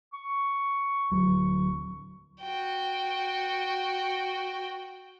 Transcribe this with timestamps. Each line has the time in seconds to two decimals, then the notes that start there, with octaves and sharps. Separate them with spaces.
0.13 C#6
1.11 D1 F#3
2.42 F#4 G5